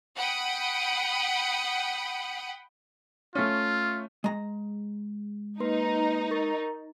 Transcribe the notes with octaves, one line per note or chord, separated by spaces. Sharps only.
F#5 G5 B5 D#6
A3 C#4 F4
G#3 A#5
A#3 D#4 B4 C6
A#4 C#6 A6